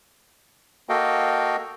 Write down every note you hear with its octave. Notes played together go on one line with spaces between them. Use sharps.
A#3 F#4 A4 D#5 F5 G5